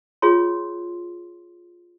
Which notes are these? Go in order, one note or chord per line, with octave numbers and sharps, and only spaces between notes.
F4 G#4 C#5 C6